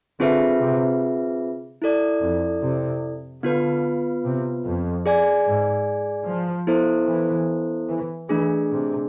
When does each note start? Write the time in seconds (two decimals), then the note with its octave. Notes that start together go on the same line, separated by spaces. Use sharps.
0.20 D3 C4 F4 G#4 B4 E5
0.60 C3
1.82 E4 A4 D5
2.22 F2
2.63 C3
3.43 D3 B3 F4 B4
4.24 C3
4.65 F2
5.06 G#4 D5 G#5
5.46 G#2
6.27 F3
6.67 B3 E4 A4 C5
7.07 E3
7.88 E3
8.28 E3 A3 D4 G#4
8.70 C3